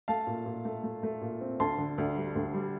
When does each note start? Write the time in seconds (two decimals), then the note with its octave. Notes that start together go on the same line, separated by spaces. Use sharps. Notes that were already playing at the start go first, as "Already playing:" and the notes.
0.08 A3 F5 A5
0.27 A#2
0.46 A#2
0.65 A3
0.84 A3
1.03 A3
1.21 A#2
1.41 C4
1.60 D2 A5 C6
1.78 D3
1.98 D2
2.17 G3
2.36 D2
2.54 G3